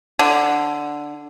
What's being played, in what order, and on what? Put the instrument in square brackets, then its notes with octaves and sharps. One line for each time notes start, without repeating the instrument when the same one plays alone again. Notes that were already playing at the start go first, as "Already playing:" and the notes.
[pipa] D3